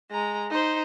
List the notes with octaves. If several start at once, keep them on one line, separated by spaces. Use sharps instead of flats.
G#3 A#5
D#4 C5